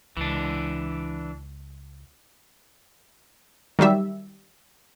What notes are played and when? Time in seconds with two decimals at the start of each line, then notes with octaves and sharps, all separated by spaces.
0.17 C#2 E3 D4
3.79 D#3 F#3 G3 E5